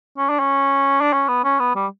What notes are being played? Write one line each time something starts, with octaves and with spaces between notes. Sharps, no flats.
C#4
D4
C#4
D4
C#4
B3
C#4
B3
G3